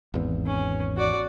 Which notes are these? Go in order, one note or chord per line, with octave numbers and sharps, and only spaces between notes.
G#1 E2
C#4
F#4 D5